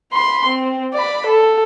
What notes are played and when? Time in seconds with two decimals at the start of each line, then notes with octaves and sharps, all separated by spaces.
0.13 B5 C6
0.47 C4
0.94 D5 B5
1.27 A4